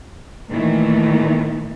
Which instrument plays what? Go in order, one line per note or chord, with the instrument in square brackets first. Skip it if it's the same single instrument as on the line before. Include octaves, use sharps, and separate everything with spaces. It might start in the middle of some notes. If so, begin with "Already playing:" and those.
[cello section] A#2 D#3 E3 A3